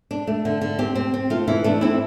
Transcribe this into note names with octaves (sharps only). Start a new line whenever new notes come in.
D4
A3
D3
D3
C4 G4
C4
C4
A3 F4
E3 E4
A3 D4
C4 E4